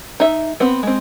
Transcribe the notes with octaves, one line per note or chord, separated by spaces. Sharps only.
D#4 E5
B3 C4
G#3 C4